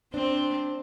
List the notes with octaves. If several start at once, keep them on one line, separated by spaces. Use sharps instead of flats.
C4 D4